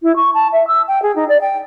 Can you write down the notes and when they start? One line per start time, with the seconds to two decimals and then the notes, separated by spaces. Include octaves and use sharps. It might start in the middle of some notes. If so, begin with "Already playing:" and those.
0.03 E4
0.16 C#6
0.34 A5
0.52 E5
0.67 E6
0.88 G5
1.02 G#4
1.16 D#4
1.28 D5
1.41 G5